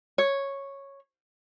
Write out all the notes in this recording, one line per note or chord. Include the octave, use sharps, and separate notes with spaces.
C#5